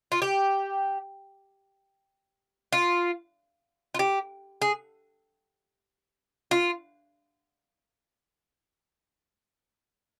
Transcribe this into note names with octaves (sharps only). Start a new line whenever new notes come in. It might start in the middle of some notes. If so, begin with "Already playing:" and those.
F4
G4
F4
F4
G4
G#4
F4